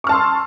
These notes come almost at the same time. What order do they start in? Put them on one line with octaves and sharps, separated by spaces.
C#6 F6 A5 C6 E6